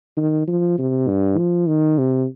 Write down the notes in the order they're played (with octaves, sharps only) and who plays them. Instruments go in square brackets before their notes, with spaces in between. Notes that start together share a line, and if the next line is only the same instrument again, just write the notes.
[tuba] D#3
F3
C3
G2
F3
D#3
C3